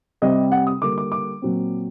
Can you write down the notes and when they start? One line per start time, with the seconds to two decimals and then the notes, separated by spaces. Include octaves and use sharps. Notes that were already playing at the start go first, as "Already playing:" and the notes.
0.22 C3 G3 C4 D#5
0.52 F#5
0.67 D#6
0.82 D3 G3 A#3 D6
0.98 D6
1.12 D6
1.42 A#2 F#3 C4